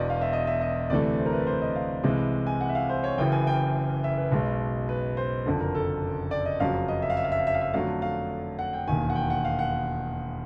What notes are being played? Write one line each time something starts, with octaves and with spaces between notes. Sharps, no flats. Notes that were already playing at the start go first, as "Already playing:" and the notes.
Already playing: E1 E2 B2 D5 D#5
F5
E5
D#5
E5
D#5
D2 C3 E3 A3 D5
C5
A#4
B4
C5
D#5
F5
C2 C3 E3 G#3
G#5
F#5
E5
F5
C5
C#5
F#1 F#2 C#3 E3 G5
G#5
G5
E5
B4
B1 B2 G#3
B4
C5
F#1 F2 D3
A#4
A4
D5
D#5
F#1 F2 C#3 F#3 F5
D#5
E5
F5
E5
F5
E5
F5
E5
F5
E5
F2 D3 F#3 A3 F5
F5
F#5
G5
E1 D#2 D#3 G#5
F#5
G5
F#5
F5
F#5